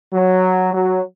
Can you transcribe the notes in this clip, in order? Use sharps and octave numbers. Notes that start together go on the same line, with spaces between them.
F#3
F#3